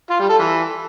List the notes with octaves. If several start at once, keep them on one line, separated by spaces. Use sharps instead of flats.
F4
G3
A4
E3